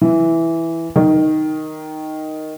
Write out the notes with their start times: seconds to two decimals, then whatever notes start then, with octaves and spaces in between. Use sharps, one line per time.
0.01 E3
0.96 D#3